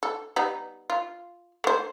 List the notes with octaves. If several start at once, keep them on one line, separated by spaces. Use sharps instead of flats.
A4
G3 B3 D#4
F4
A3 C5